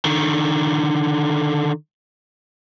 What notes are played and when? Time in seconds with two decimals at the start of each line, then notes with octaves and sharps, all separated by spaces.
0.05 D3 D#3